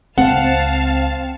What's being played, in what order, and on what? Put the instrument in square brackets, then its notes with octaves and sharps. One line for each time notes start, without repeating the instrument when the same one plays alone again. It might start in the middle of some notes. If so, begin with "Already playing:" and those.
[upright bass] C#2 [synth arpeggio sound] C4 [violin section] F5 A5 [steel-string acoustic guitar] F#5